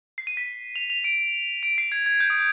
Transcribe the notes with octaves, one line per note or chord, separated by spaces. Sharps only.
C7
D#7
B6
F7
F7
D7
D7
C7
G#6
G#6
G6
D#6